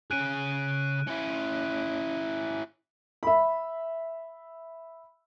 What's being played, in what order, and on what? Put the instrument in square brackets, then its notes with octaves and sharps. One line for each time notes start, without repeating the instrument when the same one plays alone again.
[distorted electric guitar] C#3 G#4 [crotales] F#6 D7 D#7
[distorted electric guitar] C#4 E4
[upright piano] E5 B5